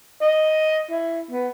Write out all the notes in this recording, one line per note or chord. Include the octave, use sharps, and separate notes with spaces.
D#5
E4
B3